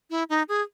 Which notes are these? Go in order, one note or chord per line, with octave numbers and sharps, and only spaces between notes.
E4
D#4
G#4